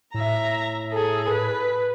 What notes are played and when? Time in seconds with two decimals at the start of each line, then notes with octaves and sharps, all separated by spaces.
0.14 A2 E5 A#5
0.93 G#4 A4
1.30 B4